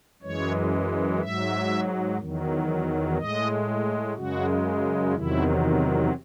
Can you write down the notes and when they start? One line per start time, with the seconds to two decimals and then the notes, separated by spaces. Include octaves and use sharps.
0.22 F#2 E3 G#3 C#5
1.21 G#2 F#3 E5
2.20 E2 D#3 F#3
3.18 A2 G#3 D#5
4.16 F#2 C#3 G#3 F#4
5.14 E2 C3 D#3 F#3 E4